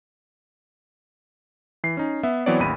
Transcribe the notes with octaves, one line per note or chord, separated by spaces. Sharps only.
E3 C7
C#4 D#4
B3 E5
E3 F#3 B3 C4 C#5 D5
A1 D#2 B5 D#7